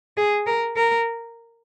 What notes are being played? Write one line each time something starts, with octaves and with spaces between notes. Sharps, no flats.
G#4
A#4
A#4